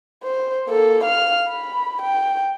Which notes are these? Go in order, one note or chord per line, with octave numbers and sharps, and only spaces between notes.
C5
A#3 A4
F5 F6
B5
G5